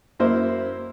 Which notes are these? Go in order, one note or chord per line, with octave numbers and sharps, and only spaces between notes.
F#2 A#3 E4 C5